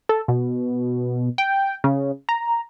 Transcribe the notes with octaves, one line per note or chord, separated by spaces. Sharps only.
A4
B2
G5
C#3
A#5